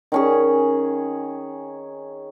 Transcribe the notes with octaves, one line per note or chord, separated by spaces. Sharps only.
D#3 C#4 G#4